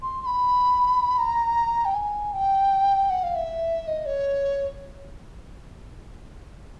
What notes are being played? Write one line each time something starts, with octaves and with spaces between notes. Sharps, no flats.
C6
C6
B5
A#5
G5
G#5
G5
F#5
F5
E5
D#5
C#5